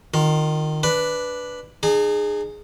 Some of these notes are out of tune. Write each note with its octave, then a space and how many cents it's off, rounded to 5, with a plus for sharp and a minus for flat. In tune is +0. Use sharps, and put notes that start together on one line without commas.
D#3 -20 F4 +15
D4 +0 B4 +0
D#4 -45 G#4 +0